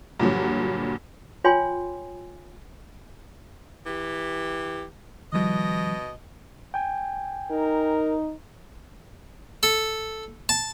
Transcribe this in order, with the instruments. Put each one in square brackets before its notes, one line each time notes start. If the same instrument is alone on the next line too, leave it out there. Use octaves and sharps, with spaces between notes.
[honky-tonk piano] G2 A#2 D3 F3 F#3
[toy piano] F4 C#5 G5 G#5 C6
[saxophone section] E3 G4
[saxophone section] B2 D#5 [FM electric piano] D#3 F3 G3
[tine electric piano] G5 G#5
[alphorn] D#4 [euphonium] A#4
[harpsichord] A4
A5